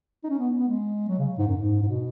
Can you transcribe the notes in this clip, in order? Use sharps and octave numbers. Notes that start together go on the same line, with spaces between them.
D#4
C#4
B3
B3
G#3
F#3
C#3
G#2
F#2
G#2
G#2
B2